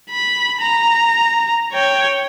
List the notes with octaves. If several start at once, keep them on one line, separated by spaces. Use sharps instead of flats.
B5
A#5
C#5 G5